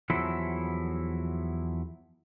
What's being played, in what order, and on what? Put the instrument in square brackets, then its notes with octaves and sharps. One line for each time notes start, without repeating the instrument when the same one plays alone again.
[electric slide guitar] E2 F3 F#3 E4 A4